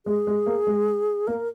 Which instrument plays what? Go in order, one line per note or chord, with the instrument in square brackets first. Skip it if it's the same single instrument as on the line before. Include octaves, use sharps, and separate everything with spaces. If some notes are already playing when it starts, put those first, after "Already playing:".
[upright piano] G#3 [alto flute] G#4
[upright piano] G#3
A#3
G#3
[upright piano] A#3 [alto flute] A#4